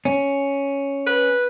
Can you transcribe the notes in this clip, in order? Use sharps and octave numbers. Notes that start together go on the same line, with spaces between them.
C#4
B4